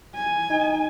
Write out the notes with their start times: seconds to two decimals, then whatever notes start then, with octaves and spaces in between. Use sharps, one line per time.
0.15 G#5
0.50 D#4